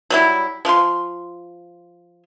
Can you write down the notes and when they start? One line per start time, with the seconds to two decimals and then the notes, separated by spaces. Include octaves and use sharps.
0.10 F#3 G3 E4
0.65 F3 F4 B4 C6